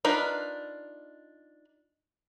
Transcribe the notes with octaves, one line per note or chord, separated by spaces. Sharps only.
D4 D#4 F4 A#4 B4